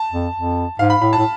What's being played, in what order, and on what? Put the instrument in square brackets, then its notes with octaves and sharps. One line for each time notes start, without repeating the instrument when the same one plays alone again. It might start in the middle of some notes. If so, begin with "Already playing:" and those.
Already playing: [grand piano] A5
[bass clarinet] F2
F2
[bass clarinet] G#2 [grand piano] F5
[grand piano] B5
[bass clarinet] A2 [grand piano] B5
[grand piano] A5
[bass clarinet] A2